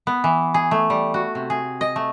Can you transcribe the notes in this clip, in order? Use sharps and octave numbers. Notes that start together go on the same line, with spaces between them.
B3
E3
G#4
A3
G3
F#4
C3
G#4
D#5
A3